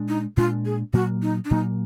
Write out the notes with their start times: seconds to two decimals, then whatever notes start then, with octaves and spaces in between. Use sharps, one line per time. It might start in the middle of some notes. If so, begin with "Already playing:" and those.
Already playing: A#2 G#3 D4
0.08 D#4
0.37 A#2 G#3 D4 F4
0.65 G#4
0.93 A#2 F#3 A#3 F#4
1.22 D#4
1.45 D4
1.51 A#2 F#3 A#3 D#4